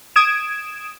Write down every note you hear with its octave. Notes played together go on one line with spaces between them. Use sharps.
D#6 G#6 D7 E7